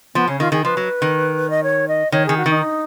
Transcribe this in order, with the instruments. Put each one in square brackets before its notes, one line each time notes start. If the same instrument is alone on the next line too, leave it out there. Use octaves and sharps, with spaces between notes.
[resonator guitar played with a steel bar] F3 [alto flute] B3
[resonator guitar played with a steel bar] C#3 [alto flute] C#4
[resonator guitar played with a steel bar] D#3 [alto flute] F4
[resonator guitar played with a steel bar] D#3 [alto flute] G#4
[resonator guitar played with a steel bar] F3 [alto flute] B4
[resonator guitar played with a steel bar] F#3
D#3
[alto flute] D#5
C#5
D#5
[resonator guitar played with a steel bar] D#3 [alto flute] C#5
[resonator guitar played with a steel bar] D#3 [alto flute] G#4
[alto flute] F#4
[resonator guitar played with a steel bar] D#3 [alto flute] D#4